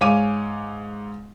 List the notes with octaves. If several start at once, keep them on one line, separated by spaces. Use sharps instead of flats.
G#2 C#5 F5 G#5 D6 D#7